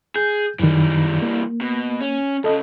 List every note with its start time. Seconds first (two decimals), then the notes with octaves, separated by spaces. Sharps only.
0.16 G#4 G6
0.60 F#2 D#3 E3 G3
1.22 A#3
1.61 B2
2.01 C#4
2.44 C#2 C#3 A4 D#5